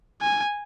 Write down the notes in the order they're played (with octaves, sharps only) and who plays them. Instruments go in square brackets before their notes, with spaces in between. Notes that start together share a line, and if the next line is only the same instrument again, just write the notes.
[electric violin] G#5